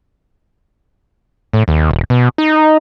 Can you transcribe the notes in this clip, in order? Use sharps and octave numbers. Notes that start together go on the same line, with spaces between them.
A2
D#2
D#1
B2
D#4